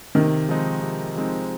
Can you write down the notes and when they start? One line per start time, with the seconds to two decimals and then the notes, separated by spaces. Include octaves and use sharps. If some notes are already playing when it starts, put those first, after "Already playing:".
0.15 C3 D#3
0.49 F3 G#3 C4 D#4
0.82 C3
1.16 F3 G#3 C4 D#4